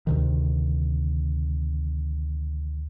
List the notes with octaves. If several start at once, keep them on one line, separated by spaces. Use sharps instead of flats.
D2 C3 D#3